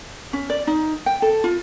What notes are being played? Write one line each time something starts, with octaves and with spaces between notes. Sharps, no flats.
C#4
D5
D#4
G5
A4
F4